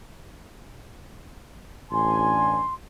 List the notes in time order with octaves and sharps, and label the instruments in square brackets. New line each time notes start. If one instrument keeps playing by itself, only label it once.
[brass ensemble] A1 D4 G#5 [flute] C6